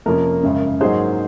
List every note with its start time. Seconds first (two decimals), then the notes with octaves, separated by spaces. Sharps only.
0.06 F2 C3 F3 A#3 C#4 A#4
0.43 G#1 F#2 C#3
0.81 G#2 F#3 A#3 D#4 G#4 C5